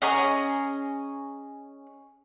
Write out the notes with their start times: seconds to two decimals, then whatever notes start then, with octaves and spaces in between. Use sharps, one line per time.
0.02 C#4 G#4 D#5 A#5